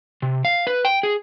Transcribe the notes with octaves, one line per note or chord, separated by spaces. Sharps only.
C3
F5
B4
G5
G#4